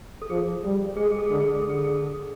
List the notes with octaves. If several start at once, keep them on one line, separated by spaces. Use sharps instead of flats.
A4
F3 G#4
G3
G#3 G#4
A4
G#4
A4
G#4
D3 A4
G#4
A4
G#4
D3 A4
G#4
A4
G#4
A4